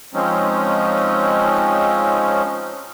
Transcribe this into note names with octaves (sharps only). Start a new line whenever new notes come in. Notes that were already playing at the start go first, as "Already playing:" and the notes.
F3 G#3 C4 C#4 D#4